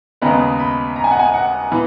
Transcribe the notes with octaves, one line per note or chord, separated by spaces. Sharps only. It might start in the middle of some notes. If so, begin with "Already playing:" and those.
D#2 C#3 G#3 B3 A#5
B5
A#5
G#5
F#5
G#5
F#5
E3 B3